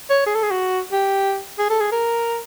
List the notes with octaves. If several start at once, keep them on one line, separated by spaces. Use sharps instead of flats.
C#5
G#4
A4
G#4
F#4
G4
G#4
A4
G#4
A#4